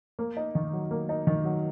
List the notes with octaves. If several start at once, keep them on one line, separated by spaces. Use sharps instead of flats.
A#3
D#4
D#3
F#3
A#3
D#4
D#3
F#3